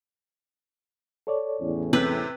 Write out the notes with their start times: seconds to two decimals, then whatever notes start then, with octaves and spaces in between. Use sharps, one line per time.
1.27 A4 C#5 D5
1.61 E2 A2 C#4
1.93 C3 B4 G6